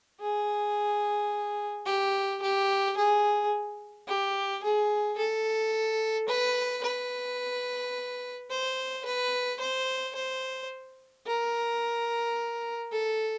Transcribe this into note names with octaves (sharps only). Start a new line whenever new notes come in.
G#4
G4
G4
G#4
G4
G#4
A4
B4
B4
C5
B4
C5
C5
A#4
A4